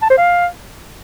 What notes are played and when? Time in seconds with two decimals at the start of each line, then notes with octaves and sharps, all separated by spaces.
0.02 A5
0.10 C5
0.18 F5